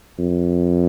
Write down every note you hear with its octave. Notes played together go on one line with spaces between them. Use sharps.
F2